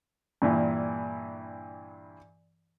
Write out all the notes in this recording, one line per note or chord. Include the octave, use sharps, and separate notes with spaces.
G2 A#2 E3